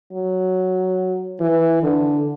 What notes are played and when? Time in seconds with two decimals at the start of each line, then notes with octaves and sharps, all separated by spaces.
0.13 F#3
1.40 E3
1.83 D3